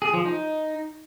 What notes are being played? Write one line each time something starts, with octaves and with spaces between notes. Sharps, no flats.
G#4
F3
D#4